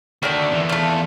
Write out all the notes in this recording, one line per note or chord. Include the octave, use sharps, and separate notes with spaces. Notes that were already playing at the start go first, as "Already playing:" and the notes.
D3 D#3 A3 F#4 D5
E2 B3
A3 F4